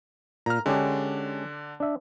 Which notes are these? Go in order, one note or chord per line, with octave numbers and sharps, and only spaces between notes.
A#2 A#5 F6
D3 G#3 C#4 D4 G4
D4 E5